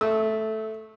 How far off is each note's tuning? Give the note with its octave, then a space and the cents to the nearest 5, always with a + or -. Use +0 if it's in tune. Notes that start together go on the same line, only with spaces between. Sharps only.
A3 -5 E6 -25